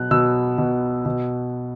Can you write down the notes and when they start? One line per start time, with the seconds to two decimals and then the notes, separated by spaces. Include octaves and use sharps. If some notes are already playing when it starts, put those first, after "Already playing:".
Already playing: B2 F#3 F#6
0.11 B2 E6
0.58 B2
1.06 B2